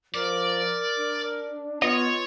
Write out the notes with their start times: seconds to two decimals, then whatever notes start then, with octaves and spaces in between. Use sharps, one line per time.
0.14 F3 A#4 D5
0.99 D4
1.82 B3 F4 C#5 D#5